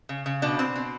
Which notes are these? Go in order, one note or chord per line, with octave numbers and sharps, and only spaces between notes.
C#3
C#3
B2 D4
C4
B2